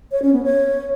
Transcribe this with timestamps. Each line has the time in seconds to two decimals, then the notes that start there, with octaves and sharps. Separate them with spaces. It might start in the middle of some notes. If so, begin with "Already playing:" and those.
0.12 C#5
0.22 C#4
0.33 B3
0.43 C#5